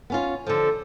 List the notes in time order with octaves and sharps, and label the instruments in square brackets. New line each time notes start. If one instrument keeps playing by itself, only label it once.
[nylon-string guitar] B3 C#4 F4
[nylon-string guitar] D3 F3 [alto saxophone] A4